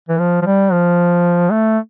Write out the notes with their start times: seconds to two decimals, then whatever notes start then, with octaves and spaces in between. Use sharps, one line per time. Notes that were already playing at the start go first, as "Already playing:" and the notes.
0.09 E3
0.19 F3
0.42 F3
0.46 G3
0.72 F3
1.51 A3